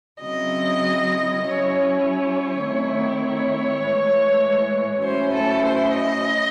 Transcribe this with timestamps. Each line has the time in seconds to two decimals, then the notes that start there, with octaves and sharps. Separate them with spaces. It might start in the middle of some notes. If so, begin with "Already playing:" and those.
0.21 C#3 F#3 C4 E4 D#5
1.41 F#3 C#4 E4 C#5
2.02 C#5
2.61 D#3 A3 C4 E4
3.22 C#5
3.82 A2 E3 G#3
5.03 A2 F#3 C#4 E4 C5
5.33 A4
5.64 C5
5.93 D#5